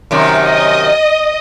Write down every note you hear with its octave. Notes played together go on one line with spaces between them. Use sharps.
F#2 C3 D#3
D#5